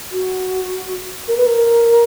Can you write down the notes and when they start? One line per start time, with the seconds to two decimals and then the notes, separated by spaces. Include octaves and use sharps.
0.12 F#4
1.28 A#4
1.37 B4
1.46 A#4